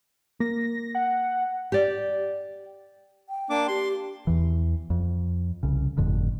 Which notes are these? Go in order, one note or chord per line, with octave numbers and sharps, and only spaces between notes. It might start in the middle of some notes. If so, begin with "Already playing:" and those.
A#3 A#6
F#5
G4 D5
G5
A#3 D4 D6
G4 C6
E2 E3
F2
C2 C#3
G1 F2 A2 D3